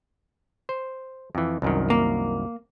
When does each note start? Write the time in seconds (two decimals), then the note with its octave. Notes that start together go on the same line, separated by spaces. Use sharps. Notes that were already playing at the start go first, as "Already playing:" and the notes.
0.69 C5
1.35 F2 E3
1.62 C2 F#2 D#3
1.90 A#3